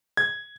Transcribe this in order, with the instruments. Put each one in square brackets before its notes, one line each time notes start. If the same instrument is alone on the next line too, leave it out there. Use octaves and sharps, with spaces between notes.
[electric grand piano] G#6